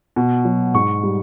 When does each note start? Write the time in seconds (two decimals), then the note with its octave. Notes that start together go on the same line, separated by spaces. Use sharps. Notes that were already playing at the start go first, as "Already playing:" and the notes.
0.16 B2
0.45 F#3
0.74 G#2 C#6
1.03 G3